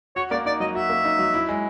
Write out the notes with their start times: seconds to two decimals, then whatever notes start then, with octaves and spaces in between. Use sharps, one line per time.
0.16 F#4 C#5
0.31 A#3 D5
0.45 D#4 D5
0.60 F#3 D#5
0.75 F#4 E5
0.90 A#3
1.05 D#4
1.19 F#3
1.34 E4
1.49 G#3